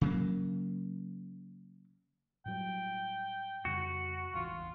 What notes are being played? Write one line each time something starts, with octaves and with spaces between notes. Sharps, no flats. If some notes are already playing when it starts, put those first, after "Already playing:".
C#3 F#3 A#3
A2 F#3 G3 G5
F2 C#3 G3 F#4
E1 A1 E2 F4